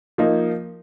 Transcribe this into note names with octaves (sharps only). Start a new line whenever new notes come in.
F3 A#3 D#4